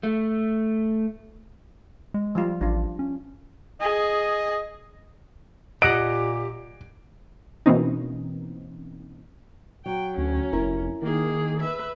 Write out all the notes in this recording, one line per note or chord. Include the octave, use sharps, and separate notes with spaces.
A3
G#3
F3 G3 F4
A1 D4 F4
C#4
G#4 D#5
A#2 G4 D#5 F#5 D7
B2 E3 A#3 C4 C#4 D#4
F#3 G5
D2 C#4
F1 E4 A#4
D#3 A#3 G#4
B4 E5